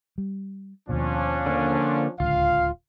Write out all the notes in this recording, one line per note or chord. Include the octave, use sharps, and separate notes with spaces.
G3
D#2 B2 F3 C#4 D4
D3 A#3
D1 C#2 D3 F4 F5